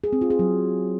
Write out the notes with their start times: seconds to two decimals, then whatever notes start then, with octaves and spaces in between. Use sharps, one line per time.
0.04 G#4
0.13 C4
0.21 F4
0.30 G#4
0.39 F#3